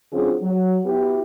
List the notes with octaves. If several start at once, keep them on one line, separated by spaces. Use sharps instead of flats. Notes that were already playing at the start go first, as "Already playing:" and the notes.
D3 F#3 C4 C#4 F4 G#4
F#3
B3 E4 F#4 G4